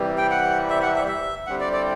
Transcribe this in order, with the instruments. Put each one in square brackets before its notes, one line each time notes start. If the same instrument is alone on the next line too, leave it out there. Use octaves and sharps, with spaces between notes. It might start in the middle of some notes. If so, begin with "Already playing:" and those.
Already playing: [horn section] C3 E3 G3
[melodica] G5
F#5
E5
F#5
E5
E5
[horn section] G2 D3 G3 C4 E4 [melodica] F#5
[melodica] D5
D5